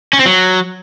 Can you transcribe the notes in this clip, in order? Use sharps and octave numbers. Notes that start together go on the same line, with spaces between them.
C#4
C4
F#3